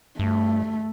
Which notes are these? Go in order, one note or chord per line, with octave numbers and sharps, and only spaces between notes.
G2 A3